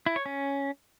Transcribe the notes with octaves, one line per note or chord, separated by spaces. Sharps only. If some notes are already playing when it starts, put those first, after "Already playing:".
E4
C#5
C#4